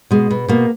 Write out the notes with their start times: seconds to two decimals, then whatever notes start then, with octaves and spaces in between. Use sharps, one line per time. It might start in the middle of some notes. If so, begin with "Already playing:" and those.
0.11 B2 G#3
0.31 B2
0.48 B2 A#3